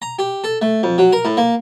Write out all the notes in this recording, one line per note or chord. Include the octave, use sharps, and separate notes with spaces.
A#5
G4
A4
A3
F2
F#3
A#4
A2
A#3